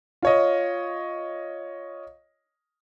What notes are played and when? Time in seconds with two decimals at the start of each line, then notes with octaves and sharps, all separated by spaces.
0.22 F4 C#5 D#5